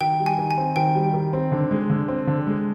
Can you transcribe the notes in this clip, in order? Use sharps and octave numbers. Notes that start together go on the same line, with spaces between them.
D#3 G5
G3
G#5
D#3
G#5
C4
D#3 G5
G3
D#3
C4
D3
G#3
D3
C4
D3
G#3